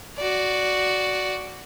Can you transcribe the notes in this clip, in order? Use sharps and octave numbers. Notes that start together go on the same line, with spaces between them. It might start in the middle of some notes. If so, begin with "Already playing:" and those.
F#4 D5